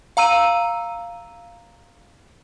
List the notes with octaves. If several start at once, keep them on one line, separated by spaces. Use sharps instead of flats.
F5 A#5 E6 D#7